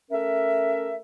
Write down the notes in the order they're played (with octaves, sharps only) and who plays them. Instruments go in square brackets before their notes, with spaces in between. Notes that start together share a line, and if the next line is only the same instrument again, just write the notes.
[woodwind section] A3 C#4 A#4 E5